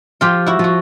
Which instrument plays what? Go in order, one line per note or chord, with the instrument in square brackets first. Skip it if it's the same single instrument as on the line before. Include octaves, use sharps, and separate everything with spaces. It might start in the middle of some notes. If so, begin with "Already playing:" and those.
[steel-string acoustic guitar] F3 [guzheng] F4 G4
[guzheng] E4 F#4
[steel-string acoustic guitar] F3 [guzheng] F#4